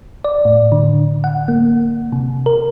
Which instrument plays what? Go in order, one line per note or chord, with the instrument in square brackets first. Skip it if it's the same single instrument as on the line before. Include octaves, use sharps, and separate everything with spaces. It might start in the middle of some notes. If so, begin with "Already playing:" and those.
[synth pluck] D5
A2
D3
F#5
A#3
C3
A#4